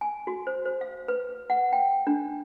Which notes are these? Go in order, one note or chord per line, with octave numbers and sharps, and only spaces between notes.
G#5
F#4
C5
C5
F5
B4
F#5
G5
D4